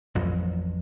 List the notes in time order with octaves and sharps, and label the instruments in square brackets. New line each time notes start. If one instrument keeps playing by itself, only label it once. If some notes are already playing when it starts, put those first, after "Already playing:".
[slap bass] A1 F2 F3 F#3